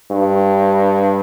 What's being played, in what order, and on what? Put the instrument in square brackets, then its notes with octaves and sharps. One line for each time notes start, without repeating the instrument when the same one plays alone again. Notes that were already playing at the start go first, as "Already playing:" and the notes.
[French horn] G2